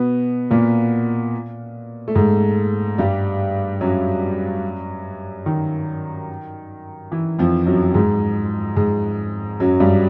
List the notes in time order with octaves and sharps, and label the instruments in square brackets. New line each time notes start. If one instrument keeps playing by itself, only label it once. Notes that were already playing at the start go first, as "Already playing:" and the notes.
Already playing: [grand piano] B2 B3
A#2 A#3
A3
G#2 G#3
G2 G3
F#2 F#3
D#3
E3
F2 F3
F#2 F#3
G#2 G#3
G#2 G#3
F#2 F#3
G2 G3